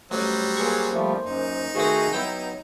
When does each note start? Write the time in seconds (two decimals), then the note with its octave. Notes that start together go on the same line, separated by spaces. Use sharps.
0.11 A1 F#3 G3 C5
0.57 A#2 G#4 C#6
0.94 F3 G3 A3
1.26 F#2 D#4
1.75 D#3 A3 C4 F#4 G#4
2.13 F#3 B3 E4 C5 G5